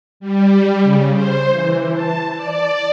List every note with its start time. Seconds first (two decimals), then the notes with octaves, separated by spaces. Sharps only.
0.20 G3
0.83 C#3
1.14 C5
1.51 E3
1.92 A5
2.35 D5